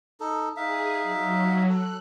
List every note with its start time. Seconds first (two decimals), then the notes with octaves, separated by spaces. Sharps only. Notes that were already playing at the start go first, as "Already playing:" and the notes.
0.20 D#4 A4
0.57 D#4 G#4 E5 F5
1.02 F#3
1.69 A4 F#6